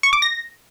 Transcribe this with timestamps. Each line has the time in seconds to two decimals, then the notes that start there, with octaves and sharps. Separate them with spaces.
0.03 C#6
0.13 D6
0.22 A#6